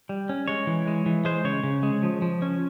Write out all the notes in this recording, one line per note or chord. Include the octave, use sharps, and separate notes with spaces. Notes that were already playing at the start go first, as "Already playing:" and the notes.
G3
C#4
G#3 C#5
E3
G#3
E3
G#3 C5
C#3 C#5
C#3
G#3
F3
F3
C#4